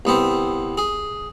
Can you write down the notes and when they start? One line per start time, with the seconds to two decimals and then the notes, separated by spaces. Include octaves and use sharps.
0.05 C2 B3 C4
0.78 G#4